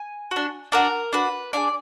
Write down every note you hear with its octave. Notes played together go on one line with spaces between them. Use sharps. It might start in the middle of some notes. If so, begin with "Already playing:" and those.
Already playing: G#5
D4 F#4
D4 F#4 A#4
D4 F#4 B4
D4 F4 G#4 D5